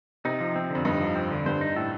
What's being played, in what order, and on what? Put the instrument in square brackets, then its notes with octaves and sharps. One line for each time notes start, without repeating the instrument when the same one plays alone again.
[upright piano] C3 [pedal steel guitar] D#4
[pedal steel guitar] F3
C4
[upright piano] F2 [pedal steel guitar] D3
[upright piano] G2 [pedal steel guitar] D#4
[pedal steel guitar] F3
[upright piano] F2 [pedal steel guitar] C4
[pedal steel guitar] D3
[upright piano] G2 [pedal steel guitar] C5
[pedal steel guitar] D#4
[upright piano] A2 [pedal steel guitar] A4